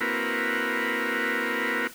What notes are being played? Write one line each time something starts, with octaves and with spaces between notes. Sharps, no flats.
A#3 C4 E4 F#4 A#4 B4